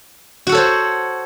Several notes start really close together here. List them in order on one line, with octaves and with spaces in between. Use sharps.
F#4 F#5 A4 C#5 C5